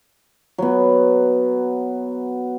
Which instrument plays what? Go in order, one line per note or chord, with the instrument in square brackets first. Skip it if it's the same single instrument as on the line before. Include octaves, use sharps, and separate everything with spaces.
[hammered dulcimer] F#3 B3